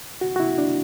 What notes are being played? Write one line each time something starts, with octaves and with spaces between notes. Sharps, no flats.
F#4
F#4
E4
D4